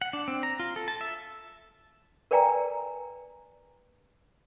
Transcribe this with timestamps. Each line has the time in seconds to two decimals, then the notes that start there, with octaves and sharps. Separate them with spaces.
0.01 F#5
0.13 D4
0.28 C4
0.43 A#5
0.60 F4
0.76 A4
0.88 A5
1.01 E5
2.31 A#4 B4 D5 G5 G#5 A#5